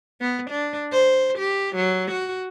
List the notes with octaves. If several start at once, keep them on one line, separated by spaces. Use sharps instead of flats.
B3
D4
C5
G4
F#3
F#4